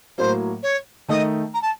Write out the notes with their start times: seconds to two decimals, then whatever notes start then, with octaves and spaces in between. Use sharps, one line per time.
0.18 A2 F#3 A#3 C5
0.63 C#5
1.08 D#3 A3 D#4 D#5
1.54 A#5
1.61 A5